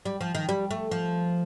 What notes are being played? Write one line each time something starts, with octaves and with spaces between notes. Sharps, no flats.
G3
F3
D#3
G3
A3
F3